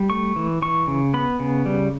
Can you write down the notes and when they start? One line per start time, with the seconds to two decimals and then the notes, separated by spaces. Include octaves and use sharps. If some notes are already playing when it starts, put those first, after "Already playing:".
Already playing: G3
0.10 A3 C#6
0.36 E3
0.62 E3 C#6
0.87 C#3
1.14 B3 B5
1.40 C#3
1.66 G3